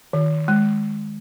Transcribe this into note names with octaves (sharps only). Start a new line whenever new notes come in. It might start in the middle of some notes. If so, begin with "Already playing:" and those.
D#3
G#3